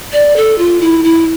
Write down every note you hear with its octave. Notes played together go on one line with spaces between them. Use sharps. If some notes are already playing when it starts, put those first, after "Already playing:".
D5
A4
F4
E4
E4